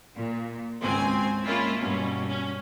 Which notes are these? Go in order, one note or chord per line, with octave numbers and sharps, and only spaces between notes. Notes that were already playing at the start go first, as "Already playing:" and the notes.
A#2
G#1 C#2 C4 G#5
G#3 A#3 C#4 E4 F4
G2 B2 C#4
C#4